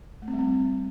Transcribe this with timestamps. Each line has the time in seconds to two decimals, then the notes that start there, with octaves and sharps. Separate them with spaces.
0.22 A3
0.28 C4
0.33 G3
0.39 C4